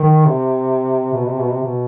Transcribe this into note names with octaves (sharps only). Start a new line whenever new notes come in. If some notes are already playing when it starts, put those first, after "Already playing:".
Already playing: D#3
C3
B2
C3
B2
C3
B2